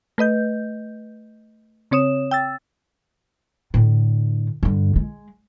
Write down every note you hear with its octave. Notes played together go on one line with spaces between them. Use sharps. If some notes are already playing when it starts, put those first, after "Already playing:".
A3 B4 D#5 G6
C#3 C4 C#5 D#6 E7
G5 E6 A6
A2 D3
G2 D3
G#3